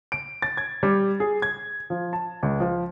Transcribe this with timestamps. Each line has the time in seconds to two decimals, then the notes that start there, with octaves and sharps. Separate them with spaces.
0.12 D7
0.42 A6
0.57 G#6
0.83 G3
1.20 G#4
1.42 G#6
1.90 F3
2.13 A5
2.43 C#2
2.60 F3